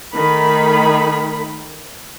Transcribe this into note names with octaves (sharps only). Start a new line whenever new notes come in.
D#3 A3 B5